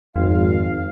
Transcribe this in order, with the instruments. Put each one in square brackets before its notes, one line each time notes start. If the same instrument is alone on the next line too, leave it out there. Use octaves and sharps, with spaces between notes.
[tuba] G#1 [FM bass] F2 [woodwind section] F5